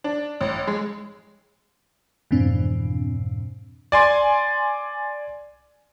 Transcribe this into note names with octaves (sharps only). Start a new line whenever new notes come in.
D4
A1
G#3
F2 G#2 B2 E3 C4 D4
D5 G#5 C6